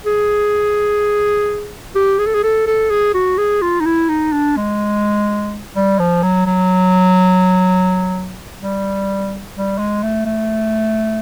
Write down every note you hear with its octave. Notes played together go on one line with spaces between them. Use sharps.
G#4
G4
G#4
A4
G#4
A4
A4
G#4
F#4
G#4
F4
D#4
E4
D#4
D4
G#3
G3
F3
F#3
F#3
G3
G3
G#3
A3
A3